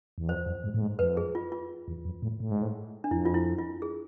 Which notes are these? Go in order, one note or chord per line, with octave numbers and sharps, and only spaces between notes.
E2
F2 C5
F2
G#2
A2
G#2
F2 B4
G#4
F4
F4
E2
F2
A2
A2
G#2
A2
D4
F2 E4
F4
E4
F4
G#4